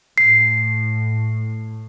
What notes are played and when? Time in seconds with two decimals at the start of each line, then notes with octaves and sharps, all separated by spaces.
0.18 A2 C7